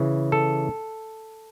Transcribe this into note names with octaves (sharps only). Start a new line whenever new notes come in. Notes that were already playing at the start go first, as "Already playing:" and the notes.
Already playing: C#3 E3
A4